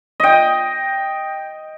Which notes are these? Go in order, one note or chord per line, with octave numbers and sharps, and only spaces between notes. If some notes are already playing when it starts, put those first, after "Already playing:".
D#5 G5